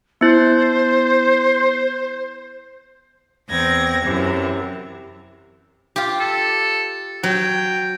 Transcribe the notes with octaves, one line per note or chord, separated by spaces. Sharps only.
B3 E4 C5
E2 C4 G#6 A#6
F#2 C3 E3
F4 G4
A4
F#3 G5